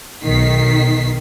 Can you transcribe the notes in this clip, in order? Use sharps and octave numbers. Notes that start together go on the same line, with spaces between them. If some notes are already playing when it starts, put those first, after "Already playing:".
B1 D#3 B6 C7